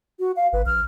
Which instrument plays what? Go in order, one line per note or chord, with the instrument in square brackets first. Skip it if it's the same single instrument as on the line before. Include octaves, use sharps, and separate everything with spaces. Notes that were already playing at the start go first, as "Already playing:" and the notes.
[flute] F#4
F5
[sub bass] G#1 [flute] B4
[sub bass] A#1 [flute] F6